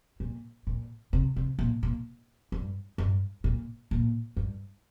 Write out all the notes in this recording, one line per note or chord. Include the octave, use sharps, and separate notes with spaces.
A#2
A#2
C3
C3
A#2
A#2
G2
G2
A#2
A#2
G2